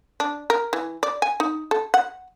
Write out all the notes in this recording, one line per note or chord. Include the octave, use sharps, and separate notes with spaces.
D4
A#4
E3
D5
G#5
D#4
A4
F#5